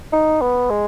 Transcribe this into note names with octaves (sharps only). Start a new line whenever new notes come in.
D#4
B3
G#3